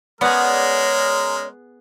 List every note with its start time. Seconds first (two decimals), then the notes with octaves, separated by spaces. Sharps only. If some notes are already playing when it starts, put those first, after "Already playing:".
0.21 G#3 B3 C#4 G#4 A#4 C#5 D5